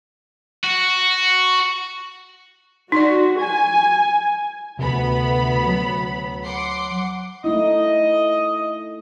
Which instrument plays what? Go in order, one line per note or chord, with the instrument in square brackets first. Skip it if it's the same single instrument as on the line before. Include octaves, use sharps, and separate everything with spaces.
[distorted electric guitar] F#4
[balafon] D#4 D5 [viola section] F#4
[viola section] G#5
[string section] D2 B3 B5 [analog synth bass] C3
[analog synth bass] F#3
[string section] F#5 C6 D6
[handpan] A3 D#4 E4 [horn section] D#5